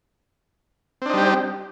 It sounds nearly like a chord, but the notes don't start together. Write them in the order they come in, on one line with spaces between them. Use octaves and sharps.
C4 D4 D#4 G3 G4